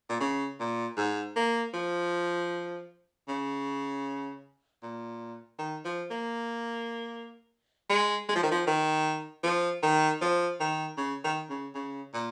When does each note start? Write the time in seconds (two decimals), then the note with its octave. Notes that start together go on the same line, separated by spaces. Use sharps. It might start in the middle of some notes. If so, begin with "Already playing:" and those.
0.09 A#2
0.20 C#3
0.60 A#2
0.97 G#2
1.36 A#3
1.74 F3
3.28 C#3
4.83 A#2
5.59 D#3
5.85 F3
6.11 A#3
7.90 G#3
8.29 G#3
8.36 F3
8.43 D#3
8.51 F3
8.67 D#3
9.43 F3
9.83 D#3
10.22 F3
10.60 D#3
10.97 C#3
11.24 D#3
11.50 C#3
11.75 C#3
12.14 A#2